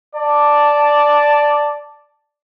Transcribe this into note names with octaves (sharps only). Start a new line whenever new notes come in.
D5 A5